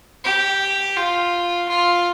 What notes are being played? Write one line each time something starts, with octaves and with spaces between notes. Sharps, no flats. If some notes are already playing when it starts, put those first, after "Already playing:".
G4
F4
F4